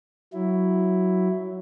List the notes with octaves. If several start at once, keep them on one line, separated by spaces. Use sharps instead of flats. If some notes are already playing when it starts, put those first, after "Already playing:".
F#3 E4